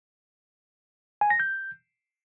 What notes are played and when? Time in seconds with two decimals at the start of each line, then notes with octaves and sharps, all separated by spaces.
1.21 G#5
1.30 A#6
1.40 G6